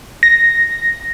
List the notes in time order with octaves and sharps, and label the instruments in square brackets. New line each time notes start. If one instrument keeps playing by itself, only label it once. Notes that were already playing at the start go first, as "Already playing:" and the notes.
[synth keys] A#6